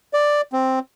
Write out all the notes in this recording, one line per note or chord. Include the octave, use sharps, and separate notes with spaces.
D5
C4